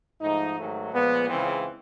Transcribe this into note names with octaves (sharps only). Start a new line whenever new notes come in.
G#2 F3 A3 D#4
G#2 D#3 F#3 A3
A#2 F3 G#3 B3
C#2 C#3 E3 C4